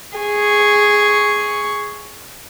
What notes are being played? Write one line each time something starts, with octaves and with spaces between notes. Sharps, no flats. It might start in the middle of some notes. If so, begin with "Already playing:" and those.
G#4 C#6